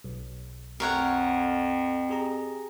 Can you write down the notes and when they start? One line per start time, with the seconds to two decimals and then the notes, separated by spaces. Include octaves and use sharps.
0.04 B1
0.80 F2 A#4 C#5 F#5
2.09 G4 G#4 A#5